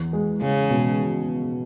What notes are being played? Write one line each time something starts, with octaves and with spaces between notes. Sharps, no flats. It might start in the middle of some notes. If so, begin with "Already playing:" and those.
Already playing: E2
G#3
C#3 G#3
B2